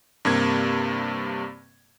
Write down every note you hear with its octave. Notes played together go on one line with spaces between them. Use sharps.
G2 C3 A#3 G#6